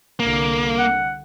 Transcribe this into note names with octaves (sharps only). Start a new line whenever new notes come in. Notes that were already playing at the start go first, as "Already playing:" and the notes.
C2 D3 A#3
F#5